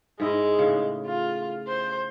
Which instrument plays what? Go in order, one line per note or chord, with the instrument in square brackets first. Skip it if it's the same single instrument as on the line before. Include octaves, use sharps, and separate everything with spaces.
[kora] G#2 E4 D#5 [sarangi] G#3
[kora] A2 C#3
[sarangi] F4
C5